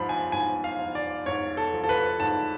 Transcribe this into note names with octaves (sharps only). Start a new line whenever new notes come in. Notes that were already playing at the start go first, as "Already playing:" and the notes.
Already playing: G#2 F3 B5
G#5
G#2 G#5
F5
F3
D5
G#2 C#5
A4
F3
A4
B4
G#2 A5